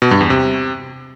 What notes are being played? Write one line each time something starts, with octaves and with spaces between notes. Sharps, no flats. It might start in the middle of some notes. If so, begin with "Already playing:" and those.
B2
G2
E2
C3